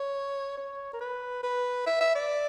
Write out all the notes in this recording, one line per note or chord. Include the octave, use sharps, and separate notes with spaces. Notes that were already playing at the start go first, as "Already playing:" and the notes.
Already playing: C#5
C#5
A#4
B4
B4
E5
E5
D5